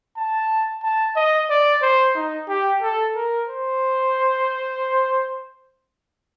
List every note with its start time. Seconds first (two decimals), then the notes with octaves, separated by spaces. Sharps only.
0.17 A5
0.83 A5
1.16 D#5
1.50 D5
1.82 C5
2.16 D#4
2.49 G4
2.82 A4
3.16 A#4
3.48 C5